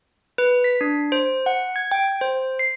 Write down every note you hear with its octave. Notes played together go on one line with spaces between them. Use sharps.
B4
B6
D4
C5
F#5
G#6
G5
C5
C7